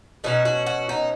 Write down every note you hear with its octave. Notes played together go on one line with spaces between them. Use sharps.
B2 F#3 C#4 D#4
F#4
F#4
D#4